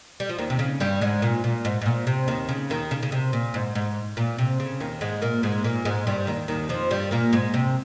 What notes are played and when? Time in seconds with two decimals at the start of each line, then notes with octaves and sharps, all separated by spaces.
0.20 G3
0.29 F3
0.38 D#2 D#3
0.50 C3
0.59 C#3
0.80 G2 G3
1.01 G#2 G#3
1.22 A#2
1.44 A#2
1.65 G#2
1.82 G#2
1.86 A#2
2.07 C3
2.28 D#2 D#3
2.49 C#3
2.70 D#2 D#3
2.91 C#3
3.03 C#3
3.12 C3
3.33 A#2
3.54 G#2
3.75 G#2
4.17 A#2
4.38 C3
4.60 C#3
4.80 D#2 D#3
5.01 G#2 G#3
5.22 A#2 A#3
5.43 G#2 G#3
5.64 A#2 A#3
5.85 G#2 G#3
6.07 G2 G3
6.27 D#2 D#3
6.48 D#2 D#3
6.69 F2 F3
6.91 G2 G3
7.11 A#2 A#3
7.33 G#2 G#3
7.54 C3